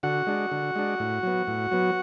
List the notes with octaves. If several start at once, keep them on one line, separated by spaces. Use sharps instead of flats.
D3 F#4 F#5
G#3 D4
D3
G#3 D4
A2
F#3 B3
A2
F#3 B3